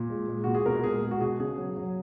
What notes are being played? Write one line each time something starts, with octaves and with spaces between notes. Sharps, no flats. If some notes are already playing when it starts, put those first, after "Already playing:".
Already playing: A#2
G#3
G#3
A#2 F#4
G#4
B2 A#4
G#3 G#4
G#3
F#4
B2 G#4
C#3 G#4
F#3
F#3